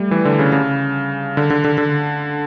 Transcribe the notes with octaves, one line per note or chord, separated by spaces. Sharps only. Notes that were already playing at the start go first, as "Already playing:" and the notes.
Already playing: G3 A3
E3
D3
C#3
C#3
D3
D3
D3
D3